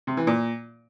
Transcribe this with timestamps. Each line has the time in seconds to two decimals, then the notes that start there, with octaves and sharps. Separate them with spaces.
0.07 C3
0.17 E3
0.27 A#2